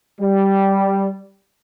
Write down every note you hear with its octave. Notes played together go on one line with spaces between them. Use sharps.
G3